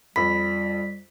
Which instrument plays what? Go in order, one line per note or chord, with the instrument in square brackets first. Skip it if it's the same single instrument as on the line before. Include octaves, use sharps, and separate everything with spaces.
[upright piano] F2 B5 [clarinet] G3 [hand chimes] B6